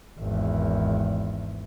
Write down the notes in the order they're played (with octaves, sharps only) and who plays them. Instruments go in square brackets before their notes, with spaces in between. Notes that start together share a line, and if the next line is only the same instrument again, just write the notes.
[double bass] G#1 E2